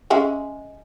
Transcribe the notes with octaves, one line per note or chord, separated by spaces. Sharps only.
G#3 C#4 E5